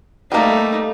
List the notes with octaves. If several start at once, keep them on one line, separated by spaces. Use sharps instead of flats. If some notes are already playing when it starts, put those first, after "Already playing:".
G3 A3 A#3 D#4